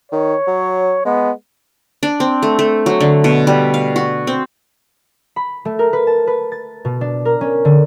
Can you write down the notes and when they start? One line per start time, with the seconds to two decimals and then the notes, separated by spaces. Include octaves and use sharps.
0.12 D#3 C#5
0.47 F#3
1.05 G#3 B3
2.03 D4
2.20 C4
2.42 A3
2.59 A3
2.86 F#3
3.00 D3
3.24 B2
3.47 G3
3.74 F5
3.96 F#4
4.27 C4
5.36 B5
5.65 A3
5.79 A#4
5.93 B4
6.07 A5
6.27 B4
6.52 A6
6.85 B2
7.01 D4
7.25 A#4
7.41 C#4
7.65 D3